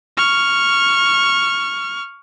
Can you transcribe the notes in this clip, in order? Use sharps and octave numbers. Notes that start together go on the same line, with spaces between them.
C#6 F6